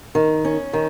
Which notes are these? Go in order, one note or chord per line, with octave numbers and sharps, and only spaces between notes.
D#3
C#4
D#3